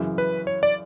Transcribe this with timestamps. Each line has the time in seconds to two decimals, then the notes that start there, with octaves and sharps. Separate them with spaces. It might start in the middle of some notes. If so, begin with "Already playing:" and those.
Already playing: F#2 C#3 E3
0.18 B4
0.47 C#5
0.63 D5